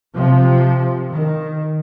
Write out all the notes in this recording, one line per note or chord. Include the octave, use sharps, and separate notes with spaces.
C3 F3
D#3